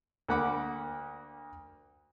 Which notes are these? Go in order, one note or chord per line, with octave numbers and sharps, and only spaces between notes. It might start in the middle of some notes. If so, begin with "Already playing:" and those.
D2 A#3 F#5 B5 D6